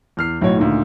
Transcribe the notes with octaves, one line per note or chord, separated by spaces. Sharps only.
E2 F6 C7
B1 A2 F#4 C#5
D2 A#2 D#3